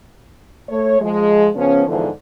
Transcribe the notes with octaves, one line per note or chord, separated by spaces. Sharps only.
A3 C#5
F3 G#3
C#3 F3 B3 C#4
E2 G#2 D3 E3 F3